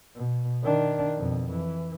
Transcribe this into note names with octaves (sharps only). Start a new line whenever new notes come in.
B2
D#3 D4
F2 B2
E3